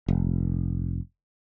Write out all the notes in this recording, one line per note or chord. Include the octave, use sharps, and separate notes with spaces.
F1